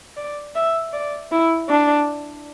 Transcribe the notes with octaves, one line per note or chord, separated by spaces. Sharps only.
D5
E5
D5
E4
D4